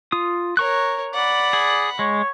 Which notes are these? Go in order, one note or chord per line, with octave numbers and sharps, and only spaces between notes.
F4 D#6
A#4 C#5 A#5 C#6 F#6
D5 F#5 B5
G#4
G#3 C#5